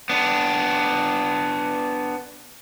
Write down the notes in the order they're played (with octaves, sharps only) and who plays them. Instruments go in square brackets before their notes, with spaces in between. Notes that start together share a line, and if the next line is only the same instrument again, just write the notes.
[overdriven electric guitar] B3 D4